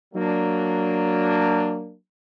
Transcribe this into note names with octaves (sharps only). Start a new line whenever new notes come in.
F#3 A#3 D4